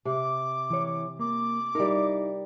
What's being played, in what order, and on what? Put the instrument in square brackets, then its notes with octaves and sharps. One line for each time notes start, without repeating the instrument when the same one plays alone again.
[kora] C3 [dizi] D6
[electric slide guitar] E3 C#5
[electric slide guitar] A#3 [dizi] D6
[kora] G3 A#4 [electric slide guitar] D#4 E4